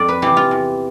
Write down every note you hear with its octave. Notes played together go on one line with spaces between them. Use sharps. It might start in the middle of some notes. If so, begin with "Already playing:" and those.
Already playing: F2 D5
B4
C3 E3 G4
F4
E2